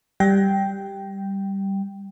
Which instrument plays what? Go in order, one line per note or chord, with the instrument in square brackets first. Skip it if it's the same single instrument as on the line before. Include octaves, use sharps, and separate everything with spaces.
[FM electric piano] G3 G5